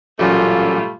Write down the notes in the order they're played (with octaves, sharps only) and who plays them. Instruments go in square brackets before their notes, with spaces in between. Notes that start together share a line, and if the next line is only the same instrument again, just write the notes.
[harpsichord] A1 F#2 A#2 [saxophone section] G3 A3 [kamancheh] F4